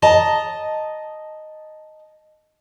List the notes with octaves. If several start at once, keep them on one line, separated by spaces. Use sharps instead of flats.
D#5 A5 A#5